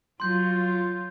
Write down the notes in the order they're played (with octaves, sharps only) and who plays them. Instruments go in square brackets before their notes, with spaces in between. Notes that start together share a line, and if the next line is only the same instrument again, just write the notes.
[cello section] F#3 F4 [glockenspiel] C6 G6